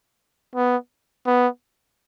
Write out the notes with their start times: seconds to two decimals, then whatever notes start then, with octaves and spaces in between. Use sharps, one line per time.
0.55 B3
1.26 B3